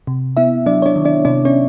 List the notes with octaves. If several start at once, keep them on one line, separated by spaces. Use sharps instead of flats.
C3
B3 E4 E5
F#3 D4 D5
C#5
D4 D5
D#3
D4 D5
C3 D4 D5
C#4 C#5